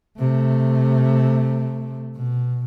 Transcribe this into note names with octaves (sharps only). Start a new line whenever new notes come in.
C3 A3
B2